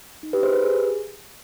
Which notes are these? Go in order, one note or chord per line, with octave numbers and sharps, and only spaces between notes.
D#4
G4 B4
G#4 C5
G4 B4
G#4